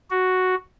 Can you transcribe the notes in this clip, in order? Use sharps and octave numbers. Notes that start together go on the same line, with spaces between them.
F#4